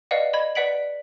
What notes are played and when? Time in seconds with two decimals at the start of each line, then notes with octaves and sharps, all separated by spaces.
0.11 B4 D5 D#5 F5 F#5
0.33 D#5 B5 G#6
0.55 B4 D5 F#5 B6 D7 F#7